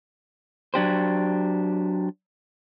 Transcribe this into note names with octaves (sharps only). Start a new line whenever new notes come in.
F#3 D4 G4 C5